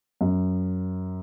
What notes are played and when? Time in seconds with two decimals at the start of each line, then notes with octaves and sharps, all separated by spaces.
0.21 F#2